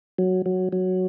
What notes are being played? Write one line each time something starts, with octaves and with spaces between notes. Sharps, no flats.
F#3
F#3
F#3